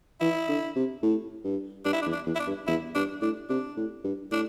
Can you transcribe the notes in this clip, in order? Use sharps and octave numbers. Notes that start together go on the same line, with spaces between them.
E3 E4
D3
C3
A2
G2
G2 D4
E4
D4
E2
D4
E2
E4
D4
G2
E2 E4
G2 D4
A2 D4
C3 D4
A2
G2
A2 D4